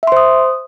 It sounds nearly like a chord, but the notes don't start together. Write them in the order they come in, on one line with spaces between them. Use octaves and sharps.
E5 C6 C5 D#6